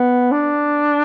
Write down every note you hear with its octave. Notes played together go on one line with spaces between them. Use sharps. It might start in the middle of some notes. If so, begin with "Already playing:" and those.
Already playing: B3
D4